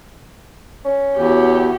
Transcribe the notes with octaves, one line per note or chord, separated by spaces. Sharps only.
C#4
E2 F#4 G4